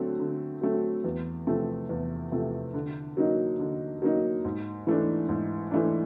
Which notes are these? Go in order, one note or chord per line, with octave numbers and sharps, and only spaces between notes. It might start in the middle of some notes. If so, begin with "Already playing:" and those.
Already playing: D3 F#3 A3 C4
D3
F#3 A3 C4
E2
C3 F3 A3 C4
E2
C3 F3 A3 C4
D3
F#3 A#3 D#4
D3
F#3 A#3 D#4
G#2
E3 A3 D4
G#2
E3 A3 D4